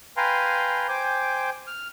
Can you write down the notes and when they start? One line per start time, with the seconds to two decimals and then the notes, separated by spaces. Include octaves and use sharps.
0.17 B4 F5 G5 G#5 A#5 C6
0.88 C5 G5 G#5 D6
1.67 F6